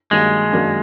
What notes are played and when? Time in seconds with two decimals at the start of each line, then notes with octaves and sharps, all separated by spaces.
0.11 G2 D#3 F#3 G#3 A#3
0.52 F#2 D#3 F#3 A#3 D4